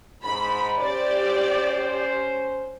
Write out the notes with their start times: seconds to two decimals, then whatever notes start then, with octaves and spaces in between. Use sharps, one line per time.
0.24 G#2 B5
0.79 C#4 G4 C5 D5